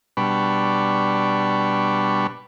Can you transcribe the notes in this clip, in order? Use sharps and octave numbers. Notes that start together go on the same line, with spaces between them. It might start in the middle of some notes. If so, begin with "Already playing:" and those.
B2 G3 D4 B4 B5 C#6